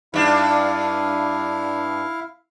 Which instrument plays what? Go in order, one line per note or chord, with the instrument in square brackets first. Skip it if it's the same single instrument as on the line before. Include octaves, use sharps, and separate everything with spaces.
[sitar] G2 D4 [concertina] E4 F5